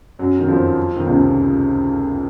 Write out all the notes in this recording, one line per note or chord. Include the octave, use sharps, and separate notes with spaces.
F#2 F#3
D#3
F2 F3
D#3
C#2 C#3
C3